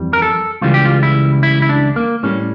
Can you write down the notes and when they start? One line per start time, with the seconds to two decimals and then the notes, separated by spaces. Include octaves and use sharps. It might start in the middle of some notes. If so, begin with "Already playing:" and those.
Already playing: F2 E3 G3
0.13 A#4
0.22 A4
0.62 C#2 C#3 E3 G3 F4
0.74 G4
0.85 F4
1.03 E4
1.43 E4
1.62 E4
1.69 D4
1.96 A#3
2.23 A2 G3 C#4